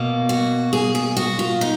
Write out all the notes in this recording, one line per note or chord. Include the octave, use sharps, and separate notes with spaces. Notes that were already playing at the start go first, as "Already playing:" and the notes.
Already playing: B2 A#3
F#4
G#4
G#4
F#4
F4
D#4